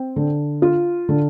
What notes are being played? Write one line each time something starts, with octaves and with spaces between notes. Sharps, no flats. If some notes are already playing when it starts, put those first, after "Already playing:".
Already playing: C4
D3
F4
D3